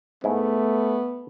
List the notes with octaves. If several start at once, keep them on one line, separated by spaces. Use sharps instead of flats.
G#2 A3 B3 E4